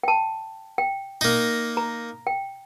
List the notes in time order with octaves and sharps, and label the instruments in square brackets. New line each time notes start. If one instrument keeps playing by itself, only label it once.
[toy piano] G5 A5
G5
[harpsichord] A#3 D#4
[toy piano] A#5
G5